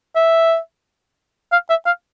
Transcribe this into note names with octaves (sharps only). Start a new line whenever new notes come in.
E5
F5
E5
F5